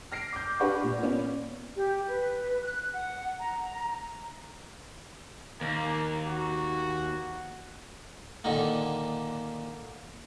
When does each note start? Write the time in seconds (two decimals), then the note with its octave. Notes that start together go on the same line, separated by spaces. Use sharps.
0.12 F6 A#6 C7 D7
0.33 D6 G6
0.60 D4 G4 B4 F#5 C#6
0.84 A#2
1.02 A#3 B3 C#4
1.76 G4
2.08 B4
2.61 F#6
2.94 F#5
3.39 A#5
5.61 D#2 A#3
6.27 F#4
8.44 A#2 D3 D#3 A#3